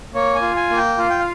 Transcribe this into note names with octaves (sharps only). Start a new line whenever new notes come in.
A#3 C#5
G#5
F4
G#5
A#3
G5
F4 F5
G5
F5